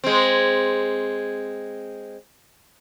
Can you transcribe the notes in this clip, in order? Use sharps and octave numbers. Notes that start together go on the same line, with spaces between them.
G#3 C4